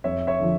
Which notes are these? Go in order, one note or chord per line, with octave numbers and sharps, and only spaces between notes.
F2 C#5 E5
C#5 E5
D3 F3